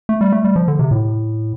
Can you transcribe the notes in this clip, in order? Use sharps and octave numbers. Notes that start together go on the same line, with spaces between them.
A3
G3
A3
G3
F3
D3
C3
A2